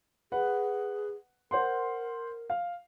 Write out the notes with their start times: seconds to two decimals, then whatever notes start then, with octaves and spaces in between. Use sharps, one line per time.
0.32 G#4 B4 F#5
1.51 A#4 C5 F#5 C6
2.50 F5